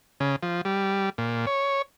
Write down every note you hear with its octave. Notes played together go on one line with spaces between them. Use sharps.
C#3
F3
G3
A#2
C#5